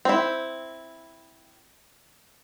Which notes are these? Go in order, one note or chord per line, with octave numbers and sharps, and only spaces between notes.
C4 E4